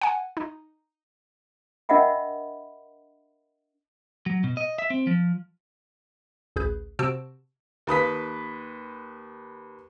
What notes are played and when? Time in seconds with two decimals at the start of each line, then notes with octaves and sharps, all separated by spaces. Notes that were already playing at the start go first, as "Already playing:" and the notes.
0.02 F#5 G#5
0.37 D#4
1.89 D4 A#4 D#5 E5 F#5 B5
4.26 F#3
4.44 B2
4.57 D#5
4.78 E5
4.90 C4
5.07 F3
6.56 A1 D2 G#4 B4 G6
6.99 C3 F#4 C5 A5 E6 D7
7.87 D#2 B4 D#6 B6